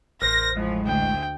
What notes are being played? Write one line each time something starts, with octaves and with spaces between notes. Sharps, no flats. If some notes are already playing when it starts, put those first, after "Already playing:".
A1 E2 A#4 C5 A#6
A2 F3 G#3
D2 G5